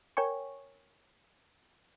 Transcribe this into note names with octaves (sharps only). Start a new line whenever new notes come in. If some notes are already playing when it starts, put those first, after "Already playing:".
A#4 C#5 G5 G#5 C#6